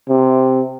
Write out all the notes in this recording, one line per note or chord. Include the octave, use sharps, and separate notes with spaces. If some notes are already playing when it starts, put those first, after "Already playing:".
C3